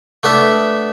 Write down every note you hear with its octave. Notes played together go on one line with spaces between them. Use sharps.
A3 B3 D4 E5